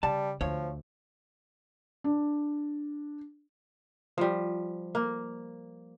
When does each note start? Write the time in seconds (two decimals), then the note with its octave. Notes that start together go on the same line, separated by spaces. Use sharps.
0.03 C#3 G3 A5
0.41 D2 F3 C#5
2.04 D4
4.18 F3 G3
4.95 A#3